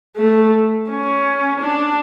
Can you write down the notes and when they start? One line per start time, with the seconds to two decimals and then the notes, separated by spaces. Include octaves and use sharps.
0.17 A3
0.89 C#4
1.61 D4